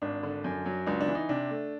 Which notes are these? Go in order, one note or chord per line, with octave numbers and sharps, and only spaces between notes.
G#1 D4
D3
F#2
F#3
C#2 D4
D4
E3
D#4
C3 D4
A3